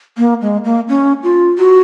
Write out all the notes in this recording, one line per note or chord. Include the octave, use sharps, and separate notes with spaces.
A#3
G#3
A#3
C#4
F4
F#4